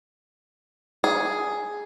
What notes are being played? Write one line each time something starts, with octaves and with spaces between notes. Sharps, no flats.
G#4